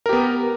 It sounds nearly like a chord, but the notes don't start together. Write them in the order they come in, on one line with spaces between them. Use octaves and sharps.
A#4 G4 B3